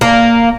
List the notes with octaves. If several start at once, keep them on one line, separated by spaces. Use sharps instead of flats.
A#3